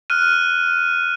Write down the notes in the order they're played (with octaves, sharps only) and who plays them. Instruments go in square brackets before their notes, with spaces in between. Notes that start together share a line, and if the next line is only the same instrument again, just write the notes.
[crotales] F6 F#6 D#7